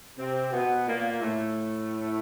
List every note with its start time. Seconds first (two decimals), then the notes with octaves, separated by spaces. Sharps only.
0.18 C3 C4
0.52 B2 B3
0.87 A#2 A#3
1.21 A2 A3